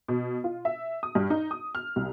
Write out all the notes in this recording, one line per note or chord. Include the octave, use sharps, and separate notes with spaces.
B2
F4
E5
D#6
G2
D#4
D#6
F6
C2